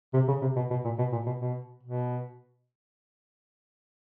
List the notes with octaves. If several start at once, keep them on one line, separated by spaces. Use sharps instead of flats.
C3
C#3
C3
B2
B2
A#2
B2
A#2
B2
B2
B2